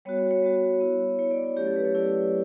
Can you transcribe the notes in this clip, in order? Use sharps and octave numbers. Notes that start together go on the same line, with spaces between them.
G3 B3 F#4 C#5
C#5
C#5
G3 B3 F#4
B3 E4
B3 E4 C#5
D5
C#5
F#3 A3 C#4 E4 G4
A4
B4
C#5
F#3 A3 C#4 E4 D5